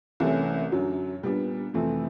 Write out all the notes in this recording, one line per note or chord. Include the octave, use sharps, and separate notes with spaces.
C2 C3 E3 A3 C#4
F#2 D3 F#3
A#2 G3 B3 D4
F2 C3 E3 A3 C4